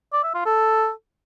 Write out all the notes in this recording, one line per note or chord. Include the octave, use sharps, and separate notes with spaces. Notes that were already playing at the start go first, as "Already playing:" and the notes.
D5
E5
F4
A4